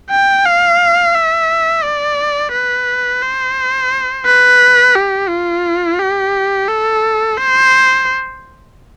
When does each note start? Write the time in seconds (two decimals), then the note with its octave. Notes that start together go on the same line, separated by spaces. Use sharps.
0.10 G5
0.45 F5
1.15 E5
1.84 D5
2.52 B4
3.22 C5
4.26 B4
4.95 G4
5.29 F4
5.99 G4
6.68 A4
7.37 C5